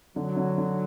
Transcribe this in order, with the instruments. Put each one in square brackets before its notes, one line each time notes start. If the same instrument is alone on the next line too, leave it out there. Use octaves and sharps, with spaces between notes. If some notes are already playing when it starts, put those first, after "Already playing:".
[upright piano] D3 [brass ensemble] F#3
[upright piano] D3
D3